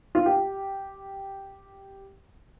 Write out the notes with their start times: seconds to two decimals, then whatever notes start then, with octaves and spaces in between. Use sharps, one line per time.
0.15 F4
0.26 G4